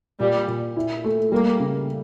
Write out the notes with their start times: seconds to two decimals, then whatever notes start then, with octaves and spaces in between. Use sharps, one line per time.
0.20 A#2 G3
0.48 A#2
0.77 E4
1.04 A3
1.32 G3 A#3
1.60 C#3